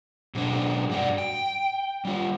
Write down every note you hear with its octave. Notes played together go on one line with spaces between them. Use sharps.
B2 F#3 G#3 D4 C5
G2 F#4 D5
G5
G3 F4